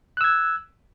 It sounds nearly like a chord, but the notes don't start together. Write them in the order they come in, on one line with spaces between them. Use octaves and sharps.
F#6 E6 G#6